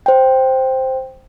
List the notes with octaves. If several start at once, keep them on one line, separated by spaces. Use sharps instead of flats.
C5 G5